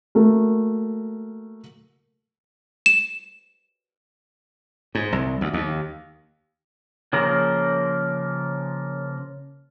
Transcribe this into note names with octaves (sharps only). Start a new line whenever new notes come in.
A3 A#3 F#4 A#4
E7
G#2
C2
D2
D#2
C#3 F3 A#3 A#4